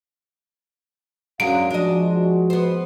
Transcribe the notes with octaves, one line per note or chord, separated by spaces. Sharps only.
F#2 D3 F#3 G#3 F5 D7
F3 G#3 D4 F#4 D#5
B3 C5